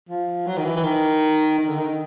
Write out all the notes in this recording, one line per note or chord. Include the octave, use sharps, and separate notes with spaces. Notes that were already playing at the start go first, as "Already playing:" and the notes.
F3
F#3
D#3
E3
E3
D#3
D#3
D3
D#3